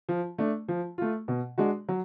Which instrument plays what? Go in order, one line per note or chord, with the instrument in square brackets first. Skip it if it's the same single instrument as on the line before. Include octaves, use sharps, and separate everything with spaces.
[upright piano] F3
A3 D4
F3
A3 F4
B2
G#3 D4 F#4
F#3